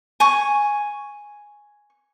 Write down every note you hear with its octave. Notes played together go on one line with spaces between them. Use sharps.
G#5 C#6